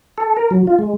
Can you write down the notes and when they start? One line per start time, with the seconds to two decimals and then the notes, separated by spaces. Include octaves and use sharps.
0.18 A4
0.37 A#4
0.51 F#3
0.67 F4
0.79 G#3